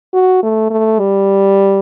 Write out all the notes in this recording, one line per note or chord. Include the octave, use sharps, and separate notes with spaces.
F#4
A3
A3
G3